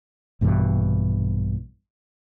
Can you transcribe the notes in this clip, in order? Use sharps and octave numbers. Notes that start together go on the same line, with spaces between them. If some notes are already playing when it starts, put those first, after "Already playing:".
A#1 G2 B2 E3